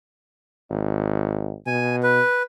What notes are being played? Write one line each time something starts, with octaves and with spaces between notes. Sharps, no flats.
G#1
B2 G#5
B4